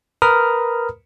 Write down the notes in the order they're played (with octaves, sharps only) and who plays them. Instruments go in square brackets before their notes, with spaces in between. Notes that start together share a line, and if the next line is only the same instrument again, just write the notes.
[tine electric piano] A#4 B4 A#5 B5 D#6 F6